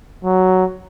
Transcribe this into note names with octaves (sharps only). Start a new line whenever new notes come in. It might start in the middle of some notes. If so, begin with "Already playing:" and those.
F#3